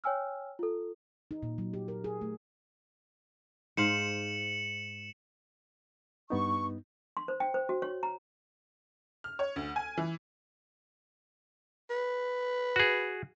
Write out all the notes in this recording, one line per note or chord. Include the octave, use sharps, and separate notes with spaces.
C#5 G5 G#5 E6 F6
F4 A4
D#4
A#2
F#3
G4
A#4
G#4
A3
G#2 C5 F5 C#7 E7 F#7
G2 B3 D#4 C#6
C6
C5
G5
C5
F#4
C#5
A#5
F6
C#5
D2
G#5
E3
B4
F#4 G#4